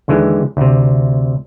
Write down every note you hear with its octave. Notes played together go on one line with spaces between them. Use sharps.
D#2 D3 E3 G#3
D2 C3